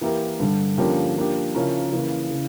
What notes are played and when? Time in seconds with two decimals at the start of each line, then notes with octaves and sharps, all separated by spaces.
0.01 E3 A#3 E4 G4 A#4
0.40 G2 D3 G3
0.78 D3 F3 A#3 C#4 G4
1.16 F3 A#3 D4 G4
1.55 C#3 F3 C#4 E4 A#4
1.92 C#3 E3 A#3
2.31 C#3 E3